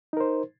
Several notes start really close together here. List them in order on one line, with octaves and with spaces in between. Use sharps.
D#4 A#4 C5